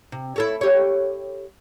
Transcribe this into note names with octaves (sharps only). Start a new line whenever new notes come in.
C3
E4 A4 C#5
G4 C#5